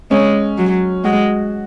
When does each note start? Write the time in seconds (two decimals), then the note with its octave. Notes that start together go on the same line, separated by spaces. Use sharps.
0.11 G#3 C#4
0.58 F#3
1.04 G#3 F#4